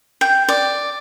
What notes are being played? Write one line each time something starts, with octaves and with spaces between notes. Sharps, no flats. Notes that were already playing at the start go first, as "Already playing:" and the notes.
G5
D5